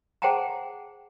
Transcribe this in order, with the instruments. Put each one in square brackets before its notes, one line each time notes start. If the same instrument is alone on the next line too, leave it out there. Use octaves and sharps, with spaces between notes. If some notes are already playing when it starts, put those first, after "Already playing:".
[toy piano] G#4 C5 F#5 G5 A5 A#5